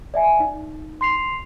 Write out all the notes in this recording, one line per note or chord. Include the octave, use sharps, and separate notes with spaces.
D5 E5 G#5
D#4
C6 C7 F7